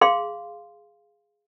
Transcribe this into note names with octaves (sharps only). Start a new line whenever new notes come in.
G#4 F5 C6